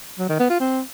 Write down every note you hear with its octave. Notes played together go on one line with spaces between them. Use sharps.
F#3
D#3
B3
F4
C4